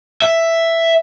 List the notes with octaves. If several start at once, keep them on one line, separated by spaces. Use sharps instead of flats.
E5